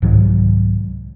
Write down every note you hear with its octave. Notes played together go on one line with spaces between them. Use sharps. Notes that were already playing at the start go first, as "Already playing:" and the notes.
C2 G#2 D#3 F#3